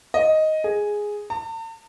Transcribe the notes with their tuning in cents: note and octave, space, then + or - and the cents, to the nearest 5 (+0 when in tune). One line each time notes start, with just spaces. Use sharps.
D#5 +5
G#4 +0
A5 +45